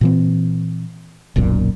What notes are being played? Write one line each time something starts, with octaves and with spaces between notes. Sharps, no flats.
A#2 E3 C4
D#1 B1 F#2 A#2